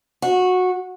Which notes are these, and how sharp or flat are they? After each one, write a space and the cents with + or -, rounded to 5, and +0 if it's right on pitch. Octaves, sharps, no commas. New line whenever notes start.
F#4 -15